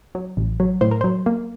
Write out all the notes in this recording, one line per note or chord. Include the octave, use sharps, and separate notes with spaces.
F#3
A1
F#3
A2 C5
A#4
F#3 C5
A#3